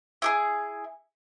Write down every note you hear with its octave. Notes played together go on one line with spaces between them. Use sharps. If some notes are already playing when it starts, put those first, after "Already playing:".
E4 G4 G#4